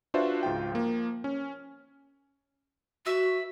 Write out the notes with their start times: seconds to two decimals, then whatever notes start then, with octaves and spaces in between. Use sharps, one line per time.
0.14 D4 F4 F#4 B4 C5 E5
0.43 C#2 G#2 F4 G5
0.72 F3 A#3
1.24 C#4
3.06 F#4 B4 E5